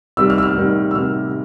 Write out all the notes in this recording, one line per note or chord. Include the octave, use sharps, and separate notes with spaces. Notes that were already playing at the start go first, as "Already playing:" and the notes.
C3 D#3 G3 E6
F6
E6
F6
C3 D#3 G3
E6
C3 D#3 G3 F6